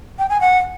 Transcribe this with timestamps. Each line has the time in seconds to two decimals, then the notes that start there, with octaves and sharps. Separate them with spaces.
0.19 G5
0.30 G#5
0.41 F#5